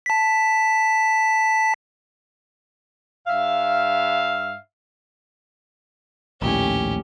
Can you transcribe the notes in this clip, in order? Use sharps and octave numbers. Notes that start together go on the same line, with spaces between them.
A5 B6
G2 E5 F5
A#1 D#2 A2 C#4 G4